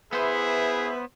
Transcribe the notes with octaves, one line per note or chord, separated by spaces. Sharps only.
B3 E4 G#4 B4 C5 E5